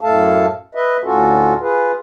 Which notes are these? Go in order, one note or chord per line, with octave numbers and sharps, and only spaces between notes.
F#2 A2 A3 A4 F5 A5
B4 D#5 E5
D2 A2 C#4 F4 F#4 A4
F4 G#4 B4